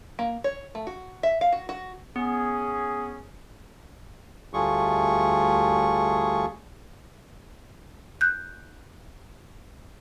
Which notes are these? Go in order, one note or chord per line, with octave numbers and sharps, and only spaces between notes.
A#3
C#5
A3
F#4
E5
F5
F#4
F#4
B3 C#4 G#4
D2 G3 A3 F4 G#4 C#6
F#6 G6